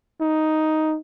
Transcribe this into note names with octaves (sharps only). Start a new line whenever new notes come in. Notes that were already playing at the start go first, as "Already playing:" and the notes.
D#4